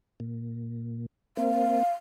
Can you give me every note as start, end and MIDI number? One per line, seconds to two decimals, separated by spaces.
0.20 1.06 46
1.37 1.83 58
1.37 1.83 60
1.37 1.92 77